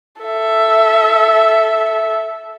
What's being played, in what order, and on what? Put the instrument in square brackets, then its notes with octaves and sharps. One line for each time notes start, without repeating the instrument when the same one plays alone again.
[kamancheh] A4 E5